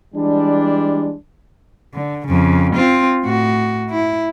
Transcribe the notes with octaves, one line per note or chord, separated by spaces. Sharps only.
E3 G3 G#3 D4
D3
F2 C#3
C4 F4
A2 F#4
E4